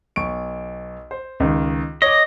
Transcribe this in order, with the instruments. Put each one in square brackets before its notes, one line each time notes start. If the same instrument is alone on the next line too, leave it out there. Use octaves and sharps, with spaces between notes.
[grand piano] B1 C#6 D7
C5
C#2 D#3
[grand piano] C#5 D6 [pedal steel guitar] D#5